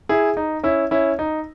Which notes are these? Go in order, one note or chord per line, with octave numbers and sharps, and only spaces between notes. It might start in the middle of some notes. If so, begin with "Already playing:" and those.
E4 G#4
D#4
C#4 E4
C#4 E4
D#4